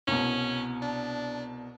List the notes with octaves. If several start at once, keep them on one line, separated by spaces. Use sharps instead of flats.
C2 B2 C#4
D4